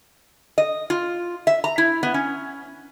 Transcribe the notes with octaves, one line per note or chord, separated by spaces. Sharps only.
D#5
F4
E5
A#5
E4
B3
C#4